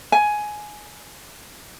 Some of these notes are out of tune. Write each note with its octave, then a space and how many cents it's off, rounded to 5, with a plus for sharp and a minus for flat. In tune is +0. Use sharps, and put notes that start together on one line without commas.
G#5 +10